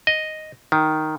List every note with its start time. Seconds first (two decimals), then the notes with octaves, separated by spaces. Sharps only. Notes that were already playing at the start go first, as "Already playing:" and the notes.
0.07 D#5
0.72 D#3